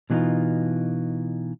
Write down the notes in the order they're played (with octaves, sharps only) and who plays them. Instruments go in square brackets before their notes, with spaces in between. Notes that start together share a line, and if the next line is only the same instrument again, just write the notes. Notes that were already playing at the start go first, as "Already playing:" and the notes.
[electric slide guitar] B2 E3 G#3 A3 D#4 F4